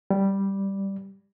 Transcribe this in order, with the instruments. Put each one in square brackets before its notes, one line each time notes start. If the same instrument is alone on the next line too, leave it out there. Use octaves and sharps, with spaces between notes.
[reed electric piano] G3